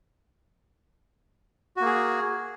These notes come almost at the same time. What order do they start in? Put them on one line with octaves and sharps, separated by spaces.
F#4 A#3 G#4